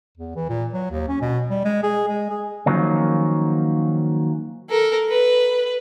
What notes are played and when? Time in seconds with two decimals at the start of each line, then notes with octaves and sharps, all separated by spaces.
0.17 E2
0.36 E3
0.49 A#2
0.73 F#3
0.91 D#2
1.08 C#4
1.22 B2
1.50 G3
1.65 G#3
1.83 G#4
2.08 G#3
2.30 G#4
2.66 D#3 F3 F#3 A#3 C#4
4.70 A4 A#4
5.09 B4